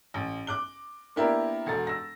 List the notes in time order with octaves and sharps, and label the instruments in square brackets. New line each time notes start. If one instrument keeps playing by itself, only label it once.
[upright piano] A1
D6 F#6 G7
A#3 B3 D4 E4 G4 A#4
E1 F#4 A4 A6
E6 A#6